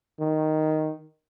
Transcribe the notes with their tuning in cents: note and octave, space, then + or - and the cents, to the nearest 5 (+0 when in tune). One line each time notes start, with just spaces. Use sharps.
D#3 +0